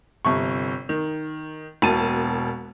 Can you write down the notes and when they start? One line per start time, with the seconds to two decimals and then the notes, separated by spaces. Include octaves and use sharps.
0.25 G1 C3 C#6
0.89 D#3
1.82 E1 B2 A#3 A5 D#7